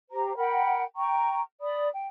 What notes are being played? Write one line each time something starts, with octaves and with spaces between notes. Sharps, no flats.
G4 C5 A#5
A#4 F#5 G5 B5
G5 A#5 C#6
D5 B5 D#6
G5